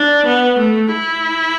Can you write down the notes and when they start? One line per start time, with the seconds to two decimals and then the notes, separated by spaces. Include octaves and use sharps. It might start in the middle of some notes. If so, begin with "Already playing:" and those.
Already playing: D4
0.25 B3
0.58 A3
0.93 E4